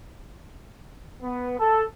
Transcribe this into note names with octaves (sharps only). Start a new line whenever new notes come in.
B3
A4